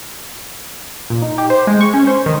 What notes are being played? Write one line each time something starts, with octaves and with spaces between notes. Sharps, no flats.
A#2
D#4
G4
C5
G#3
C#6
C#4
C5
D#3